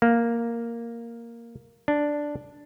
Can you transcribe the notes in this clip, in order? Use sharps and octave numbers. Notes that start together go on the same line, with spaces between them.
A#3
D4